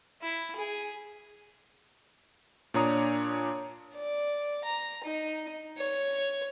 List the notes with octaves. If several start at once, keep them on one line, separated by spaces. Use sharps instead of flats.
E4
G#4
A#2 D4 C#5 A#5 D#6
D5
A#5
D#4
C#5